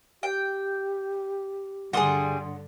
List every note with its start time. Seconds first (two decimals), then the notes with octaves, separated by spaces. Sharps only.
0.23 G4 G5
1.93 G2 D3 G3 G#4 F#5 C6 D#6